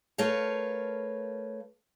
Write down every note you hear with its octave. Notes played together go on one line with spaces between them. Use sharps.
A3 A#4 B4 C#5 F5